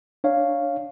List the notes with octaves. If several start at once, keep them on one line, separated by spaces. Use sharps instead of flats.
D4 C#5 F5